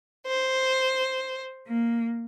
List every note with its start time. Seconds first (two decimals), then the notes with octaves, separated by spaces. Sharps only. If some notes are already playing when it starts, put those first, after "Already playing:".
0.24 C5
1.67 A#3